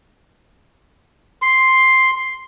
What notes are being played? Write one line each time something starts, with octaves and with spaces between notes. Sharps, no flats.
C6